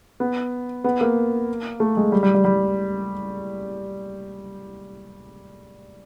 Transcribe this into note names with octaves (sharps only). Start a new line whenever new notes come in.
B3
B3
A#3
A3
G#3
G3
G3
G3
G3